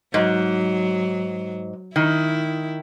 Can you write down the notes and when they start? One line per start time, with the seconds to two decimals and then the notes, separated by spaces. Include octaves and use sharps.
0.14 G#2 F#3
1.96 D#3 E4